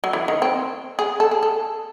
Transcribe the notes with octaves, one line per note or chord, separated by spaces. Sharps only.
F#3
E3
D#3
C4
G#4
A4
G#4
A4